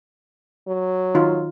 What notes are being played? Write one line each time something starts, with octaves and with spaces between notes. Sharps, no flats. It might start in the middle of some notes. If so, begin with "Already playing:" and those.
F#3
D#3 D#4 F4